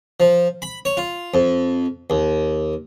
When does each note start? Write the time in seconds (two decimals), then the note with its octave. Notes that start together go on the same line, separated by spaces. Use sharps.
0.20 F3
0.62 B5
0.85 C#5
0.97 F4
1.34 F2
2.10 D#2